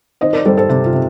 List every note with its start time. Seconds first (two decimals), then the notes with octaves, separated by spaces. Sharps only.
0.21 D#3 C5 D#5
0.33 A#4 D5
0.45 G3 A4 C5
0.57 A4 C5
0.69 C3 G4
0.85 F4
0.93 C3